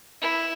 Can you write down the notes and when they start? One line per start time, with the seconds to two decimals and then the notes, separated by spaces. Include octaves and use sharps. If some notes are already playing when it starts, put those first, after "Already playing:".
0.21 E4